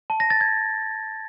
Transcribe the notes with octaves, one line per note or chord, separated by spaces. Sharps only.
A5
A#6
A6
G#6